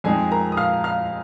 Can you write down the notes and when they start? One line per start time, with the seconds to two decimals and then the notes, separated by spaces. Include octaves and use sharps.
0.04 F2 F3 G#3 C4 D#4 G#4 G#5
0.31 A#4 A#5
0.52 D#6
0.57 F5 F6
0.84 F5 F6